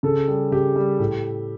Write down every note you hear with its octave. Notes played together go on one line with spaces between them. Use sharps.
C#3 A4
G3
C#3 G4
G3
A2